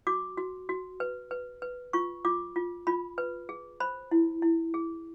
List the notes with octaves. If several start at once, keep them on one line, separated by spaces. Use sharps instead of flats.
F#4 D6
F#4
F#4
B4
B4
B4
F4 C#6
F4 D6
F4
F4 B5
B4
G#4
C5 B5
E4
E4
G#4